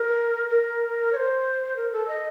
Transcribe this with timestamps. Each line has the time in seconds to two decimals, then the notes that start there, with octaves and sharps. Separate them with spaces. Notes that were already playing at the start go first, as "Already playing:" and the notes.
Already playing: A#4
0.49 A#4
1.13 C#5
1.16 C5
1.76 A#4
1.93 A4
2.08 D#5